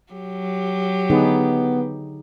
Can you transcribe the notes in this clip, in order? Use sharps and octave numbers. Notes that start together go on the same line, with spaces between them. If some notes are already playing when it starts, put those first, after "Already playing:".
F#3 G4
D3 B3 D#4 G#4